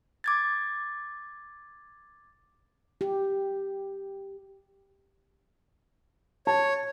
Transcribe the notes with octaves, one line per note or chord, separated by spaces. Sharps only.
D6 G#6 A6
G4
C#5 A5